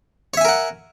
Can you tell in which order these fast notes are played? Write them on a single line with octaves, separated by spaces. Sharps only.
C#5 E5 G#5 A#4 F#5